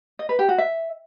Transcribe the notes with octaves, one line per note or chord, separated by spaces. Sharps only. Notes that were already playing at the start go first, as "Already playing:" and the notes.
D#5
B4
G4
F#4
E5